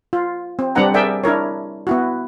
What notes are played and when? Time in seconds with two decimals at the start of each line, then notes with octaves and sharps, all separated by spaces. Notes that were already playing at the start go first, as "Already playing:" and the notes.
0.13 F4
0.59 C4
0.75 G3 C4 D4 B4 F#5 A#5
0.94 G#4 A#4 D5 E5 G5
1.24 D4 E4 A#4 C#5
1.87 B3 E4 F#4